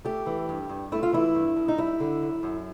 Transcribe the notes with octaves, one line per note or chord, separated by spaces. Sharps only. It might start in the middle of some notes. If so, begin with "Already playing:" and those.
A3 G4
E3
G2
G2
A3 E4
F4
E3 E4
G2
G2
D#4
G3 E4
D3
F#2
F#2